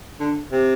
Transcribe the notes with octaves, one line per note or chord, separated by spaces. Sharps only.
D3
C3